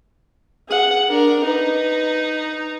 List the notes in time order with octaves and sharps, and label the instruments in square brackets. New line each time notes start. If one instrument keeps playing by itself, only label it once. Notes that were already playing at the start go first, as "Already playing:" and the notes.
[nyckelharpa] G#4 F#5
[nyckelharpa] D4 [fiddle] A#4
[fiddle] D#4 [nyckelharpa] B4